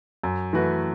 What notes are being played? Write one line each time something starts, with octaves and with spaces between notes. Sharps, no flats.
F#2
E3 A3 F#4 B4